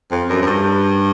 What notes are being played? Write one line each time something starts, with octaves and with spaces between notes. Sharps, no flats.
F2
F#2
F#2
G2